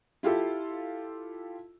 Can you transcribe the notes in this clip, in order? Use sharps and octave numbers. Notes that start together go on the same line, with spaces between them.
E4 F4 G4 A4